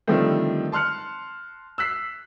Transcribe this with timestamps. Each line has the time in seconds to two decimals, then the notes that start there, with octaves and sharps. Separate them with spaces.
0.07 D3 D#3 F3 G3 A3 C4
0.72 A5 C6 F6 F#6 C#7
1.78 E6 F#6 B6 C7